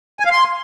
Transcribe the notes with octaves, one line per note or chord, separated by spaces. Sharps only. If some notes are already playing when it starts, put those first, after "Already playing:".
G#5
F5
C6